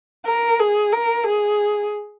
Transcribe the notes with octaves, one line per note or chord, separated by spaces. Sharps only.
A#4
G#4
A#4
G#4